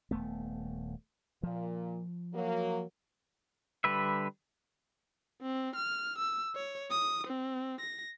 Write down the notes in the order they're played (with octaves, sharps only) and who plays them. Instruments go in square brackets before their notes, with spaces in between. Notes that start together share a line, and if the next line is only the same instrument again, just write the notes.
[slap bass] D#1 A3 B3
[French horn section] A#2 [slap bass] F3
[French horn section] F#3 A#3
[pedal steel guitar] D3 G3 B4 E5
[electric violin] C4
F6
E6
C#5
D#6
C4
A#6